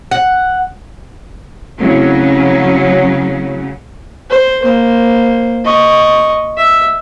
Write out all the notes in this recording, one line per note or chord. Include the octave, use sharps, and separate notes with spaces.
F#5
C#3 F#3 A3 C4 C#4 E4
C5
A#3 C5
D#5 C#6
E5